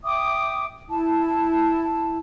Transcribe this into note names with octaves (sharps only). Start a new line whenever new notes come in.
E5 G5 D6 D#6
E4 A5